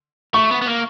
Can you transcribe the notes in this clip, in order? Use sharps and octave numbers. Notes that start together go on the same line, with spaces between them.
A3 C#6
B3
B3
A#3